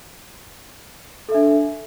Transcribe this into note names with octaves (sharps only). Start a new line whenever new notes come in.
D4 A4 E5